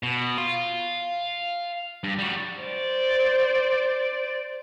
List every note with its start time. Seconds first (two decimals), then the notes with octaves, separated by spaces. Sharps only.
0.03 B2
0.38 F5 C6
2.04 G2
2.19 G3 F#4
2.62 C5 D5